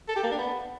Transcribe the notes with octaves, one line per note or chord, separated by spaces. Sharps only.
A4
G4
A#3
D4
B3